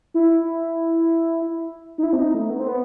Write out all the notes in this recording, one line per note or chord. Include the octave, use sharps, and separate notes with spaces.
E4
D#4
E4
C4
D#4
A3
B3
C4
B3